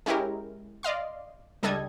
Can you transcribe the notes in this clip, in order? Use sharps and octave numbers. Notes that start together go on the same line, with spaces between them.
G#3 C#4 E4 G4 A#4
D5 D#5 F5 C6
C#2 G3 D4 A4 D#5 G#6